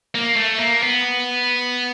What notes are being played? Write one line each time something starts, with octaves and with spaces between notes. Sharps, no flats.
A#3
A3
A#3
B3